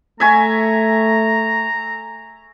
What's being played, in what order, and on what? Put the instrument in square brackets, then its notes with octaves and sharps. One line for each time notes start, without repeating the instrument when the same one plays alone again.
[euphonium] A3 [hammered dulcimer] E5 G#5 C#6 [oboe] A#5